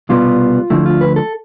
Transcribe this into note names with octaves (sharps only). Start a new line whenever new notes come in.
C2 B2 G3 B3 F4
D2 D3 F3 A3 E4
F4
B4
A4